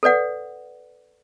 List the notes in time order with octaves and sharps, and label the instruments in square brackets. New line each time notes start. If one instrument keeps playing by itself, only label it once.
[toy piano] A4 B4 D5 F#5